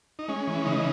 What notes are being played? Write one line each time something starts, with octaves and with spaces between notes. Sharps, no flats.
D#4
G#3 C#4
E3
C#3 D#4